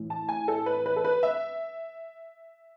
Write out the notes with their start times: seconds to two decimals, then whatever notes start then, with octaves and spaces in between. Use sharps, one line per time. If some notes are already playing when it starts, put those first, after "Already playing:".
Already playing: A2 E3
0.10 A5
0.29 G#5
0.48 A4
0.66 B4
0.86 B4
0.96 A4
1.05 B4
1.23 E5